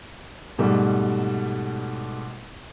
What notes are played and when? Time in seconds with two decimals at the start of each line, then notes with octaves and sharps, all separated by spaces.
0.58 G#2 B2 G3 A3